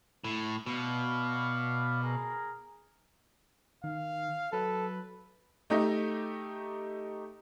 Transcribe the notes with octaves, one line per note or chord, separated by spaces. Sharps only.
A2
B2 B4 D5 F5
G#4 A#4 A#5
D#3 F5
F#3 A4 B4
A3 D#4 G4 D#5